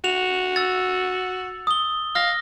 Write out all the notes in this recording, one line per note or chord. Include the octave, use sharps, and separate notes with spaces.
F#4 F7
E6 A6
D#6 G7
F5 F6 A#6